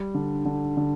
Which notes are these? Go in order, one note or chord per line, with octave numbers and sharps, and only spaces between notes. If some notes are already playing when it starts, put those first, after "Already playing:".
Already playing: G3
D3
D3
D3